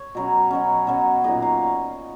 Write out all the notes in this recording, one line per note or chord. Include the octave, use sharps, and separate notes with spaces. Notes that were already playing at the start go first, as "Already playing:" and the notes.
Already playing: C#5
B2 F#3 C#4
B2 F#3 C#4
B2 F#3 C#4
A#2 F#3 A#3 D#4 D#5
F5